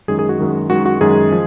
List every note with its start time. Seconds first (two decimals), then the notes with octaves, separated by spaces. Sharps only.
0.08 F#2 D#3 G#3 G#4
0.19 G#4
0.29 F#4
0.39 F#2 D#3 G#3
0.69 F#2 D#3 G#3 F#4
0.86 F#4
1.01 F#2 D#3 G#3 G#4
1.32 F3 G#3